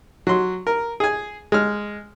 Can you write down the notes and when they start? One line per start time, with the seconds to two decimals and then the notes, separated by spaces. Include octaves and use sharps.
0.27 F#3 C6
0.67 A#4
1.00 G#4 G#5
1.52 G#3 F6